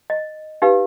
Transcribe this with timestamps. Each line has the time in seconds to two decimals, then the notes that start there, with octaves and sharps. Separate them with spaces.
0.10 D#5
0.62 D#4 G4 B4 F5